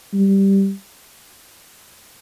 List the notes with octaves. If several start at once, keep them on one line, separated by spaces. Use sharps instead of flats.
G3